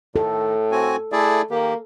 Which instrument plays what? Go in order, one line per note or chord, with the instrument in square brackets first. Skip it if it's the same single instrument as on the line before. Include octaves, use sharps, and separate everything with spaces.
[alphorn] A2 [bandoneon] D#3 [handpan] A4
[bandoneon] C4 F#4 G#5
[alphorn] A3 [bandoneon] E4 G#4 D5
[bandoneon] D#3 G4 [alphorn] A#3